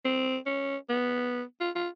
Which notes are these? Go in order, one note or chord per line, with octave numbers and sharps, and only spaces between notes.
C4
C#4
B3
F4
F4